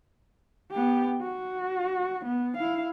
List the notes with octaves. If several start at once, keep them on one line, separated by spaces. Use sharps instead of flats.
B3 G4
F#4
B3
E4 F5